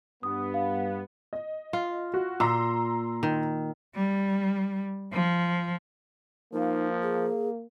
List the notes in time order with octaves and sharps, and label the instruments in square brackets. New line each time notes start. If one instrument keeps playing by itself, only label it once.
[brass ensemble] G2 B3 [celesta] D#6
[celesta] F5
[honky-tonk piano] D#5
[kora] F4
[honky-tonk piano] F#4
[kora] A#2 [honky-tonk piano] A#5 C6 E6
[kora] D#3
[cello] G3
F3
[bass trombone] F3 [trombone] A#3 [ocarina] D#4
[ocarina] G#4